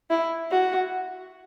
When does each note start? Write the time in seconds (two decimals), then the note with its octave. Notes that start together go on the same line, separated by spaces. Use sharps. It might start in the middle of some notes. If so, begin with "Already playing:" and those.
0.10 E4
0.51 F#4